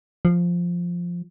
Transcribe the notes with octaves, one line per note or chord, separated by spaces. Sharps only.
F3